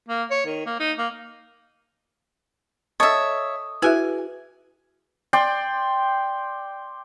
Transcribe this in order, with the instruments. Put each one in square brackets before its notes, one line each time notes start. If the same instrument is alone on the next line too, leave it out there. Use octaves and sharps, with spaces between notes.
[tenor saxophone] A#3
C#5
D#3
A#3
D#4
A#3
[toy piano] A4 D#5 A5 [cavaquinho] C#5 E5 [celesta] D#6
[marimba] E4 F#4 E5 [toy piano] G#4 B4 [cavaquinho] G#5
[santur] D5 G5 C6